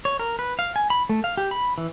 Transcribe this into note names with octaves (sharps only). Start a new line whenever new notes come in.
C#5
A#4
B4
F5
G#5
B5
A3
F5
G4
B5
E3